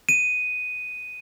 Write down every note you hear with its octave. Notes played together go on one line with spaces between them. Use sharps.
D#7